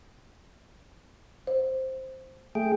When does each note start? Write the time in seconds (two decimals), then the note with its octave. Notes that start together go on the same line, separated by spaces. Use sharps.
1.47 C5
2.55 A3 G#4 G5